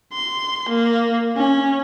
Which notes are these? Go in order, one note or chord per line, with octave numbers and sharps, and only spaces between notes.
C6
A#3
C#4